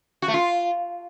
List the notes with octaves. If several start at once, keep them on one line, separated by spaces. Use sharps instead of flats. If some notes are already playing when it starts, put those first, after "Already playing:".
F#4
A3
F4